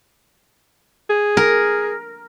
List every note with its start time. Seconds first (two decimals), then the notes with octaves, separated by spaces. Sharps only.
1.10 G#4
1.37 A#4